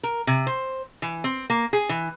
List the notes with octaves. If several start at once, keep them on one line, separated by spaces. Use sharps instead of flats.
A#4
C3
C5
E3
C4
A#3
G#4
E3